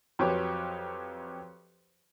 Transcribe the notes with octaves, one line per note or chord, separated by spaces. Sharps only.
F2 F#3 G4 B4 C#5 G5